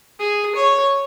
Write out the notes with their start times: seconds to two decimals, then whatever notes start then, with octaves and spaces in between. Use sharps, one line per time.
0.19 G#4
0.56 C#5